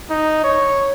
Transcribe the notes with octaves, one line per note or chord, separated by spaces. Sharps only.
D#4
C#5